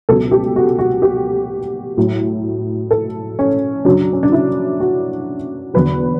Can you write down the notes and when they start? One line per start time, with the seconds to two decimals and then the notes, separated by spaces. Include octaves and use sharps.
0.09 C#2 B2 F#3 A4
0.31 G4
0.56 F#4
0.79 F#4
1.02 G4
1.97 A2 F#3
2.91 A4
3.39 C#4
3.85 F#2 C#3 F#3 D4
4.13 C#4
4.23 D4
4.32 E4
4.80 F#4
5.74 E2 D3 F#3 B4